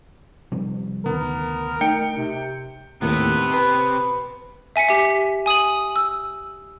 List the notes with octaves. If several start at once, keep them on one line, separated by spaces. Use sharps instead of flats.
C3 F3 G3
D2 C3 D#3 B3 A#4
A3 D#4 G5 C#7
C3
D#2 A2 C3 B3 A#4
B4 B5
E5 G#5 B6 C#7
G4 E5
G#5 D#6 D#7 F#7
E6